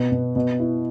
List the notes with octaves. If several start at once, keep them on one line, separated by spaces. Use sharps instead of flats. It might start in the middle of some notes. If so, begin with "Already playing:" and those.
Already playing: B2 B4
B2
B2
E4